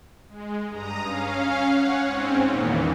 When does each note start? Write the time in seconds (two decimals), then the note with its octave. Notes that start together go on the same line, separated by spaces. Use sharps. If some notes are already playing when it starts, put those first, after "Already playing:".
0.29 G#3
0.69 G2 A#5 D#6
1.02 C#4 F5
1.64 C#5 F#5
2.04 G#2 C4 C#4
2.46 E2 A#2 D#3 E3 A#3 B3